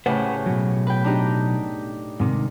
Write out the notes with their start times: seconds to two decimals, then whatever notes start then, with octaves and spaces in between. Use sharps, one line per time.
0.06 A2 C#3 G4 B4 C5 F#5
0.46 B2 F#3
0.87 B4 G5
1.04 D4 D#4 G4
2.20 G#2 C3 D#3